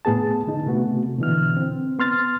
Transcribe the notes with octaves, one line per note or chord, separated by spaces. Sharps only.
A2 B3 G#4 A5
D3 D#4
C3 A3 B3 F#4
B2 D3 E3 F6
C4
B3 C6 F6 A6